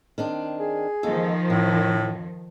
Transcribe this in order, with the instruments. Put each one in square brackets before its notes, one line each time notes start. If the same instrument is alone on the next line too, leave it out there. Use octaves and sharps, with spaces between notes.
[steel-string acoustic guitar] D#3 C4 D4
[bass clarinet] G#4
[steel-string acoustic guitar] D#2 G#3 A4 [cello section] D#3 F3
[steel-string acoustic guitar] F2 [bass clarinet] A2